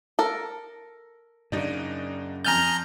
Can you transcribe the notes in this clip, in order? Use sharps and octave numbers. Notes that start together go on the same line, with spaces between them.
A4 A#4
F#2 C#3 D4 D#4
F2 G#5 A#5 F6 G6 A6